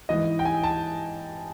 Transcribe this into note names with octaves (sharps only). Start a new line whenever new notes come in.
G#2 E3 D#5
G5
G#5
A5